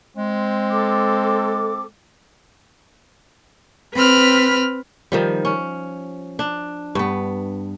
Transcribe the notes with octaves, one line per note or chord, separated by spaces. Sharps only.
G#3 C4
A4 D6
C4 B4 B5 F6
D#3 F3 G3
C#4
D4
G2 B3